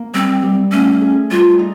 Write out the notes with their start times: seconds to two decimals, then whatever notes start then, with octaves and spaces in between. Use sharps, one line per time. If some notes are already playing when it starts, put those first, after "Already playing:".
Already playing: A#3
0.14 G3 C4
0.43 G3
0.72 A3 C#4
1.01 G#4
1.31 G3 F4
1.59 D#4